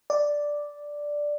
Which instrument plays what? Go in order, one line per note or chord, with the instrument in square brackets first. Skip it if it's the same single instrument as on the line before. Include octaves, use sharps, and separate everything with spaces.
[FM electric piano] D5